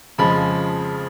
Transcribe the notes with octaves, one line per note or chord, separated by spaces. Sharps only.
F2 C#3 F3 G#3 B5